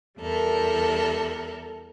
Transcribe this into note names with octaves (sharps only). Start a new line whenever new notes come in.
E2 G3 A4 A#4